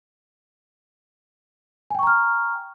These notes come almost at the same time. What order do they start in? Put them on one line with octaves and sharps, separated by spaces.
G#5 G5 C#6 A#5 F6